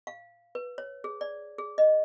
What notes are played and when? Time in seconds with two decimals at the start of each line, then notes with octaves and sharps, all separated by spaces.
0.07 F5
0.55 B4
0.78 C#5
1.04 G#4
1.21 D5
1.58 G#4
1.78 D#5